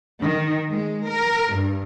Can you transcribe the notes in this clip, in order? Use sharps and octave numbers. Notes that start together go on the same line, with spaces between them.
D#3
G#3
A#4
G2